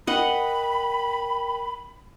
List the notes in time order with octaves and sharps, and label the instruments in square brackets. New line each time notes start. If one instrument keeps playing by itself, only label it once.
[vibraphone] A#4 G5 [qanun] D#5 F#5 [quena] B5